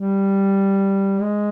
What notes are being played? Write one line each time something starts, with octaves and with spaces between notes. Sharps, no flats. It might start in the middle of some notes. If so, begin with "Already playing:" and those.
Already playing: G3
G#3